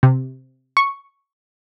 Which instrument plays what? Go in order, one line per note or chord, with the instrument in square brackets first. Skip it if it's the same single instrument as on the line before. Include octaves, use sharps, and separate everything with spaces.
[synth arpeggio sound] C3
C#6